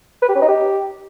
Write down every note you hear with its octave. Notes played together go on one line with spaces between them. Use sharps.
B4
G4
C#4
D#4
G4